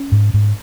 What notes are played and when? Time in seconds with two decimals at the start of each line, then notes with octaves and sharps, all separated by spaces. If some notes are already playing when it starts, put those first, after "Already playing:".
Already playing: C#4
0.12 G#2
0.34 G#2